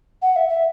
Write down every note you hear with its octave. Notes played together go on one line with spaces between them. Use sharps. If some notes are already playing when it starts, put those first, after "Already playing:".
F#5
E5
E5